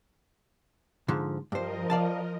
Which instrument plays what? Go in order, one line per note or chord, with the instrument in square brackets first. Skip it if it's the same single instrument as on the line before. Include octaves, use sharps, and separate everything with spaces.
[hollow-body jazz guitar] G#2 D3 F3
[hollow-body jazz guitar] G2 C5 [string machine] F3 A#4 D#5
[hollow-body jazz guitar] D5 F5 A5